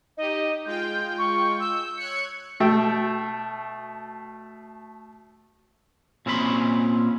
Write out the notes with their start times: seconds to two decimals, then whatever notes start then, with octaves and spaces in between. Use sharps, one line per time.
0.17 D#4 G4 D#5
0.65 G#3 F4 G5 G6
1.18 C#6
1.60 E6 G6
1.98 C#5 F#6 G#6 C#7
2.60 B2 A3 G5
6.26 A#2 C4 C#4 C5 B5 C6